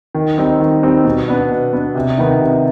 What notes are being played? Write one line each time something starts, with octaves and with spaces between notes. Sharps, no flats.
D#3
G3 C4 D#4
D#3
G3 C4 D#4
B2
B3 D4
B2
B3 D4
C3
D#3 B3 D#4
C3